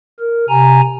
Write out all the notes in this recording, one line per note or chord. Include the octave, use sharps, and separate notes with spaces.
A#4
C3 G#5 A#5